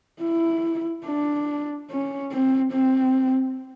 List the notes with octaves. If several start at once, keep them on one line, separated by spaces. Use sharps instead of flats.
E4
D4
C#4
C4
C4